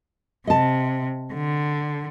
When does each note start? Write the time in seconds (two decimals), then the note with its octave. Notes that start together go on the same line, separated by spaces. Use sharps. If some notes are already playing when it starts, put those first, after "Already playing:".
0.47 C3 D#5 A5
1.34 D3